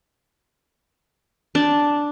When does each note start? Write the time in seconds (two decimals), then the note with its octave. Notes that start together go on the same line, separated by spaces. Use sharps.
1.55 D4